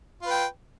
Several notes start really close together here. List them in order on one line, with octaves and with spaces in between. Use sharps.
F4 B4 G5